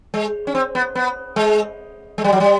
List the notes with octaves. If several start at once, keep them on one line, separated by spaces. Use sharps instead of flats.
G#3
C#4
C4
B3
B3
G#3
G#3
G3
F#3
G3